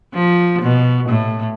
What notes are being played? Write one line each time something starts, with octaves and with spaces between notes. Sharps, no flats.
F3
B2
A2